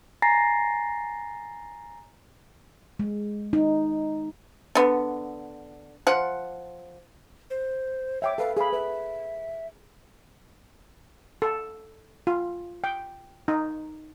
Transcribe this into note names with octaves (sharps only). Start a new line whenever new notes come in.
G#5 A#5 A6 A#6 C7
G#3
D#4
D3 B3
F3 F#5
C5
C#5 E5 G5 D6
A4 B4 F5
G#4 F5 B5
B4 E5
A4
F4
G5
D#4